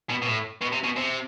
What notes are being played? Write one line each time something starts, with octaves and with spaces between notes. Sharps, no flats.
B2
B2
A2
B2
C3
B2
C3